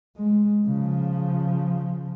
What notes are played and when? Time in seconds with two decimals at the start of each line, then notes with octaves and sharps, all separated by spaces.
0.17 G#3
0.66 C#3 F3